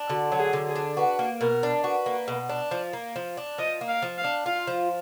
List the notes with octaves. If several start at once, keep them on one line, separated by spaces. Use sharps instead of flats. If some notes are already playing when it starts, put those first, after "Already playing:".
Already playing: D4
D3 F#4
F#3
G#4
D3
G#4
D4
F#4 B4
A#3
B2 A#4
D4
F#4 B4
A#3
B2
D4
F3
A#3
F3
D4
F3 D#5
A#3
F5
F3
F5
D4
F4 F5
F3